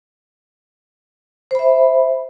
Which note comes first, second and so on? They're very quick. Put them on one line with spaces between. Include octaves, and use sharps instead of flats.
C5 B5 E5